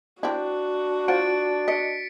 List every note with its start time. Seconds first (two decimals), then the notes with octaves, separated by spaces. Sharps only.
0.23 C4 D4 E4 F#4
1.08 F4 C5 F#5 A6 D7
1.68 D#5 B6 C#7 D7